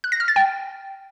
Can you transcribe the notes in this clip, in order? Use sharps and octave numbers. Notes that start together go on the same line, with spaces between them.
F#6
A#6
F6
A6
G5